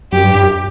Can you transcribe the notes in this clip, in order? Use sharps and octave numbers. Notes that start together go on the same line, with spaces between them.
F#2 G4
G2
G2
F#2